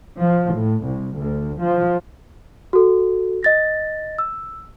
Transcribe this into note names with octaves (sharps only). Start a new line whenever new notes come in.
F3
A2
C2
D2
F3
F#4 A4
D#5 A6 A#6
E6